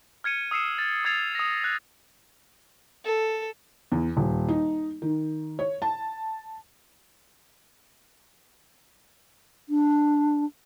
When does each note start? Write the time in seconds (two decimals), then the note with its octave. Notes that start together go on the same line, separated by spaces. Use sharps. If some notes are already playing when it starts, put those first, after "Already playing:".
0.24 F6 G#6 C#7 D#7
0.51 D#6 E6 C7 C#7 E7
0.78 A6
1.05 D#6 G#6 A6 C7 F7
1.35 D#6 A#6
1.64 F#6
3.05 A4
3.92 E2
4.17 D#1
4.48 D#4
5.02 D#3
5.59 C#5
5.82 A5
9.69 D4